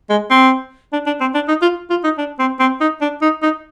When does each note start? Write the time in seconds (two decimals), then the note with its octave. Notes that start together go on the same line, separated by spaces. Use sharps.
0.10 G#3
0.30 C4
0.93 D4
1.06 D4
1.21 C4
1.34 D4
1.48 D#4
1.62 F4
1.90 F4
2.04 D#4
2.18 D4
2.39 C4
2.59 C4
2.81 D#4
3.01 D4
3.22 D#4
3.42 D#4